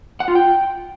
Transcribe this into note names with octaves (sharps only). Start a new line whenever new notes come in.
F#5
F4
G5